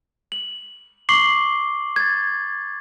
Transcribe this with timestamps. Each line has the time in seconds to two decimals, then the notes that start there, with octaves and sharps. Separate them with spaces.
0.32 F#7
1.09 C#6 D6 C7 F#7 G7
1.96 G#6 A6